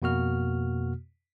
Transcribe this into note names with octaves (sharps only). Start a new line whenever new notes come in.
F2 B2 A#3 F#4 F6